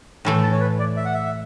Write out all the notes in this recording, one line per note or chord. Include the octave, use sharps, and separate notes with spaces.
A2 E3 A3 C#6
A5
C#5
B4
D5
E5
F#5
E5